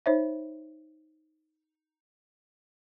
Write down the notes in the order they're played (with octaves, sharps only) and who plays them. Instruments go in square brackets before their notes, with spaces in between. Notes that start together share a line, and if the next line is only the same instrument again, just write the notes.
[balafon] D#4 C5 C#5 E5